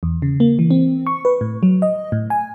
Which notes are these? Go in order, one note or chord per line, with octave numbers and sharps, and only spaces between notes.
E2
C#3
A#3
E3
C4
C#6
B4
A2
F#3
D#5
A2
G#5